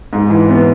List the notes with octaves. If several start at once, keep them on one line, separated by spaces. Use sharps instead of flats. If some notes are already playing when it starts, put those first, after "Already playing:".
G#2
E3
B3